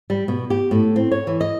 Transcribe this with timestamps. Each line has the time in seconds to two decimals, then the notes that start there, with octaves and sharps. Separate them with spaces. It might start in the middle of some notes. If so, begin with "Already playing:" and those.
0.10 G3
0.28 B2
0.50 G4
0.71 A2
0.96 C4
1.11 C#5
1.27 E3
1.41 D#5